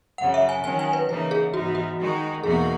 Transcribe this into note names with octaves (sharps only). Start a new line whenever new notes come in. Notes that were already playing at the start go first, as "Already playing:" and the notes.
F#2 C#3 F#3 F#5
E5
G#5
D#3 F#3 C#4 G#5
G#5
B4
C#3 E3 A#3 D#4 B4
G#4
G#2 E3 B3 D#4 F#4
F#4
D#3 G#3 D#4 F#4
E2 B2 A#3 D#4 F#4 G#4